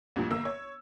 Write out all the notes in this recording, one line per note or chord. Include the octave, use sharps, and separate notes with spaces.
A1 G2 A#2 F3
G1 A#3 E6
C#5